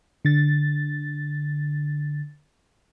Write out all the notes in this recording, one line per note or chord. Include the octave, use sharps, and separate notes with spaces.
D3 A6